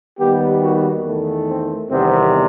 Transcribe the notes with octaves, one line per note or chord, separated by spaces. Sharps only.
D#2 D#3 G3 B3 G4
F#4
E2 D#3 A3
C4
E2 C3 D#3 G3 B3 C4